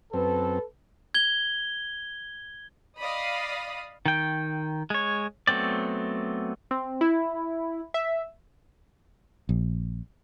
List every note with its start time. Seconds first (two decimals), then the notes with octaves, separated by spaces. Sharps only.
0.13 F#2 C4 A4 B4
1.14 G#6 G7
3.00 D5 D#5 F5 B5 D#6
4.06 D#3 G5
4.90 G#3 C#5
5.47 F#3 A3 B3 C4 D5
6.71 C4
7.01 E4
7.94 E5
9.49 A#1